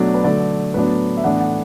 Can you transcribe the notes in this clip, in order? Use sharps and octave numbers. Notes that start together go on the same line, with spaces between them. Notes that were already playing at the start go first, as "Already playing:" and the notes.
Already playing: B2 F#3 A3 D4 D5
B4
D3 F#3 A3 D5
A2 F#3 B3 D4 B4
E5
A2 E3 B3 D4 F#5
F#5